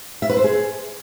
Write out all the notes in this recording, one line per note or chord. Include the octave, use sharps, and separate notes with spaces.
E5
B4
C5
G#4